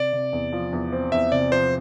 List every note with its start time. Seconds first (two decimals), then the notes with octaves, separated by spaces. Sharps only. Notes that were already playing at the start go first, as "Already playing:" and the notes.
Already playing: C3 D5
0.13 C3
0.33 E2
0.53 F3
0.73 E2
0.93 C4
1.12 E2 E5
1.32 C3 D5
1.52 F3 C5